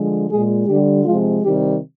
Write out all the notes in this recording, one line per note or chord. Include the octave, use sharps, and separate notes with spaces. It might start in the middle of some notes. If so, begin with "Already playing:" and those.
Already playing: D3 F3 G#3
A#2 G#3 G#4
D3 G3 G4
C3 F3 G#3 F4
C3 D#3 G3 G4